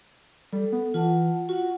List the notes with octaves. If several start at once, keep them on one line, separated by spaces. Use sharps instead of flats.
G3 A4
B3
E3 F4 F#5 A5
F4 F#4 F#5